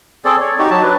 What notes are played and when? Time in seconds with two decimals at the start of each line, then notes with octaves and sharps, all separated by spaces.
0.25 C4 G#4 A4 D5
0.40 C#5
0.59 D#4 F#4 G4
0.71 F#3 A5
0.83 D4 B4